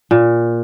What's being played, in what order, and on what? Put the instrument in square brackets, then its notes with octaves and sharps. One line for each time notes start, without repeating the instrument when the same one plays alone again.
[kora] A#2